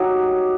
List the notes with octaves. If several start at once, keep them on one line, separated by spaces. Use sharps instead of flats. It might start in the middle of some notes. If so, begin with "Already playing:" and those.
Already playing: F#3 D#4 G4 C#5